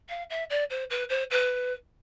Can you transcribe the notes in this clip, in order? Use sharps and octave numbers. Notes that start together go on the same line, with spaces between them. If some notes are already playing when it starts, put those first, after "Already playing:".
F5
E5
D5
C5
B4
C5
B4